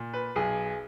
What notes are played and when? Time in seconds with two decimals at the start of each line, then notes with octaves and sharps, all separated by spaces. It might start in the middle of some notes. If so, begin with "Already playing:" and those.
Already playing: A#2
0.13 B4
0.36 B1 G#4